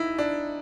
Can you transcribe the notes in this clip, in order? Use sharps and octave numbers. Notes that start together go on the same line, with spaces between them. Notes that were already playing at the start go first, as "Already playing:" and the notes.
Already playing: D#4 E4
D4